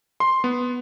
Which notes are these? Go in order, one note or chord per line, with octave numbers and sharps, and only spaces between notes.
C6
B3